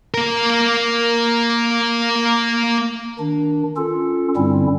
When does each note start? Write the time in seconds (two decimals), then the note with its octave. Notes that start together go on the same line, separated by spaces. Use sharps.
0.14 A#3 A#4
3.19 D#3 D4
3.77 C#4 F4 A4
4.36 G2 D3 G3 C4 C#4 E4